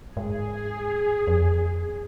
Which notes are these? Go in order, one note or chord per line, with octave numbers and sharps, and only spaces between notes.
G#2 G#4
F2